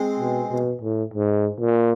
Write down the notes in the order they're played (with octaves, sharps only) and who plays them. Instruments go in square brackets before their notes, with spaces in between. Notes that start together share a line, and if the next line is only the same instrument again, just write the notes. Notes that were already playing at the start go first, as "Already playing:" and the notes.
Already playing: [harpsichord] G#3 C4
[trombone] B2
B2
A2
G#2
A#2